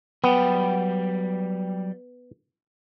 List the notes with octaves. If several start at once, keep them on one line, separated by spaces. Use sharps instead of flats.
F#3 G3 B3 G5